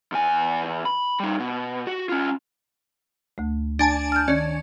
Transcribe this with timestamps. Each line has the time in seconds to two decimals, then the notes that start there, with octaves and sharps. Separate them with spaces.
0.12 E2 G#5
0.85 B5
1.20 G3 D#4
1.39 B2
1.87 F#4
2.09 C#4 F4
3.38 D2 A3
3.79 D4 G#5 A5
4.12 F6 G6
4.28 D#3 C#4 D5